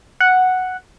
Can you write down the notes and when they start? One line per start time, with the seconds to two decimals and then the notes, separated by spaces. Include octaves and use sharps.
0.20 F#5